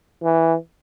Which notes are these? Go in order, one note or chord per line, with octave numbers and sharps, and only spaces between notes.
E3